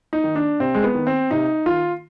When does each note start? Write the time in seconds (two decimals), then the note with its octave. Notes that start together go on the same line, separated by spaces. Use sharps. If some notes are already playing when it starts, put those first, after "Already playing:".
0.13 D#4
0.24 D#3
0.35 D4
0.60 C3 C4
0.75 G#3
0.84 B3
0.95 D#3
1.07 C4
1.31 C3 D#4
1.66 D#3 F4